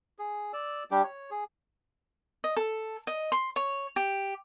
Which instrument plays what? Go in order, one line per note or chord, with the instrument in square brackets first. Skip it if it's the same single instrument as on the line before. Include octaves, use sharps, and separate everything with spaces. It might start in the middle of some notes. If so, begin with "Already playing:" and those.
[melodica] G#4
D5 E6
G3 D4 G4
C#5
G#4
[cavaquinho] D#5
A4
D#5
C6
C#5
G4